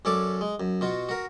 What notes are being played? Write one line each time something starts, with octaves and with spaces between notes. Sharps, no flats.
F#2 C#4 A4 D5 D6
G#3
F#2
B2 F4 F#4
F#4 A#4